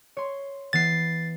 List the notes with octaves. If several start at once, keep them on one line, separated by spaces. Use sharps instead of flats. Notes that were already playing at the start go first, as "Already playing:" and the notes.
C#5 C6
E3 B3 A6 C7